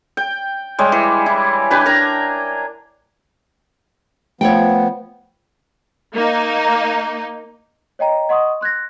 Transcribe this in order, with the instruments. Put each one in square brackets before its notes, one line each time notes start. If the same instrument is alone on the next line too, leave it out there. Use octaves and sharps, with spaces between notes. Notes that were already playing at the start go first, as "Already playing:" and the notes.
[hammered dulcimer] G5
G3 G#3 C#5
E3
E4
D4 G4 B4 G#5
A#4 G5 G#5 A#5
[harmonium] F3 B3 [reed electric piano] A3 [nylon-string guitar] C#5 F#5 G5
[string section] A#3 D#4
[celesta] C#5 D#5 G5 A#5
D#5 F#5 C6 C#6 D#6
C6 F#6 G#6 A#6